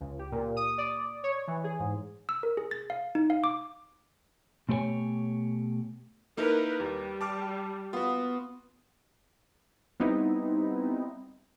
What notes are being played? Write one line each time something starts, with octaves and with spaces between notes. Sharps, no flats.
C#2
G4
A#2
D#6
D5
C#5
E3
G#4
G#2
E6
A#4
G#4
A6
F5
D#4
F5
D6
B2 A3 G4 C5 C#5 G#5
A#3 D#4 E4 A#4 B4
D#2 G3
A5 D6 F6
B3 F4 F#4
G3 B3 C4 D#4 E4